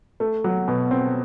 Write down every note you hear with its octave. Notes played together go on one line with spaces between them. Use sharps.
A3
F#3
B2
C4